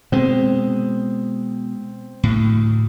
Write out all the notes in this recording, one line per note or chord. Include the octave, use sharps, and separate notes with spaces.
B2 G#3 C4
D2 A2